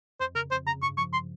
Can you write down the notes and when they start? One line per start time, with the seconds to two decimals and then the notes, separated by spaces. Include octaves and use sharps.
0.20 F2 C5
0.35 C#3 A#4
0.51 F2 C5
0.66 C#3 A#5
0.82 G2 C#6
0.98 F3 C#6
1.13 C6